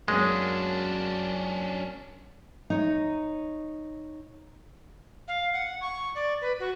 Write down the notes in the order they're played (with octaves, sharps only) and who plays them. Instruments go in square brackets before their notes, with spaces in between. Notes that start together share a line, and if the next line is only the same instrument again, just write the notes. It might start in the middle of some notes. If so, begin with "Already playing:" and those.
[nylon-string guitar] F#2 F#3 A#3 [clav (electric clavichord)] G#3 [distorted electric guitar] C#4 D4
[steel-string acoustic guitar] D#4 C#5
[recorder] F5
F#5
C#6
D5
B4
F#4